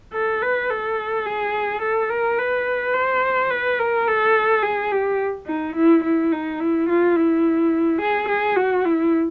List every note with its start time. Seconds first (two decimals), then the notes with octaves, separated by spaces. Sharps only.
0.13 A4
0.42 B4
0.70 A4
1.26 G#4
1.82 A4
2.10 A#4
2.38 B4
2.94 C5
3.50 B4
3.79 A#4
4.07 A4
4.62 G#4
4.91 G4
5.47 D#4
5.75 E4
6.04 E4
6.32 D#4
6.60 E4
6.89 F4
7.16 E4
8.01 G#4
8.28 G#4
8.56 F#4
8.85 E4